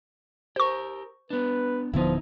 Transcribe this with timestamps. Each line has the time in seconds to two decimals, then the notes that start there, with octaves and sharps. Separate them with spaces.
0.56 G4 A#4 C5 C#6
1.30 B3 D4 B4
1.94 D1 D3 F3 B3 D#4 E4